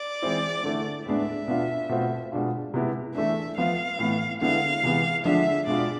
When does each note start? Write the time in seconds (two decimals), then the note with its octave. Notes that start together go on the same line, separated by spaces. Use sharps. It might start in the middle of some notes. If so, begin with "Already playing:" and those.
Already playing: D5
0.22 E3 G#3 C4 E4
0.64 D3 A3 E4
1.06 A2 G#3 B3 D4 E5
1.48 B2 B3 D4 F4
1.89 B2 A3 C4 F4
2.32 B2 G#3 D4 F4
2.74 C3 G#3 B3 E4
3.15 E3 A3 D4 E5
3.57 F3 B3 F4 F5
3.99 A2 E3 B3
4.41 D3 G#3 B3 E4 F5
4.83 C3 E3 G#3 B3
5.25 D3 F3 G#3 D4 E5
5.67 B2 G#3 D4 F4 D5